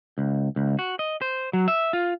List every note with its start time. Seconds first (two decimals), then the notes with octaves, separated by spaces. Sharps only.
0.18 C#2
0.56 C#2
0.79 F#4
0.99 D#5
1.21 C5
1.53 F#3
1.68 E5
1.93 F4